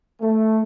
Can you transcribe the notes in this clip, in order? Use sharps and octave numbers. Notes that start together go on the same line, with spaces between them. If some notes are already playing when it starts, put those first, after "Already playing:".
A3